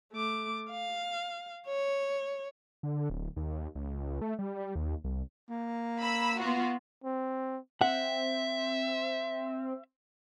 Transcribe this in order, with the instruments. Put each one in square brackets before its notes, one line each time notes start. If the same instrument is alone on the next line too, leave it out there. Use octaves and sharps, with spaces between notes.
[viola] A3 D6
F5
C#5
[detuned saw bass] D3
D1
D#2
C#2
A3
G3
D#2
C2
[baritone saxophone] A#3
[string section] B5 E6
B3 F4 F#4
[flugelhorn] C4
[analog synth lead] C4 [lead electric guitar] E5 [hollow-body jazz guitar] F#5